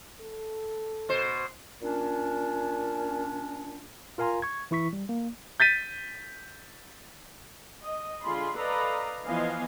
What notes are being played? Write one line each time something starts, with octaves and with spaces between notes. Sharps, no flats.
A4
B2 C5
A#2 C#4 D4
F4 A#4 F5 G#5 A#5 C6
C#6 G#6
E3 E4 C#6 B6
G3
A#3
G6 A6 B6 D#7
D#5
D3 G#3 F4 G#4 B5 C6
A4 B4 D5 D#5 F5 A#5
E3 F3 B3 D#5 F5 G#5